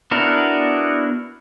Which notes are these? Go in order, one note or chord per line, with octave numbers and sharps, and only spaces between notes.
B3 D4 E4 F#4 A#4